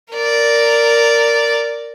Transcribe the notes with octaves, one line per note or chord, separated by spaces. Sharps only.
A#4 D5